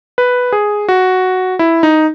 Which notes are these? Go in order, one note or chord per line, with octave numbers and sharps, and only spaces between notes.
B4
G#4
F#4
E4
D#4